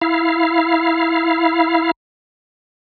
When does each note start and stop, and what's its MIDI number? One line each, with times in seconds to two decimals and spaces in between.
0.02 1.91 64
0.02 1.91 77